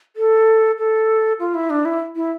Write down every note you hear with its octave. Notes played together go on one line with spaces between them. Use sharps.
A4
A4
F4
E4
D4
E4
E4